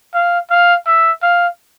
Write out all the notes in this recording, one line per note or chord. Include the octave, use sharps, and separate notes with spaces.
F5
F5
E5
F5